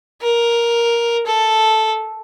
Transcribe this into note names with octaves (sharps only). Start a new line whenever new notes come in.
A#4
A4